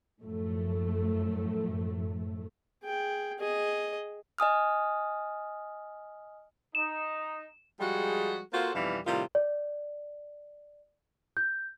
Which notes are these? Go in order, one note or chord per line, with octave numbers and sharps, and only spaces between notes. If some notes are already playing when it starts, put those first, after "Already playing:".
F#2 A2 F3 A3
G#4 G5
G#4 D#5
D#5 G#5 D#6 F6
D#4 E7
F3 G3 G#3 F#4 G#4
A#3 F4 F#4 A4 C5
F2 B2 E3 G3 D#4 F5
A2 C3 D#3 G3 F4
D5
G6